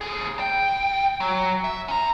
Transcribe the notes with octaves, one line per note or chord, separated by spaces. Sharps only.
D#2 G#4
A2 G5
F#3
E5
C#4 A#5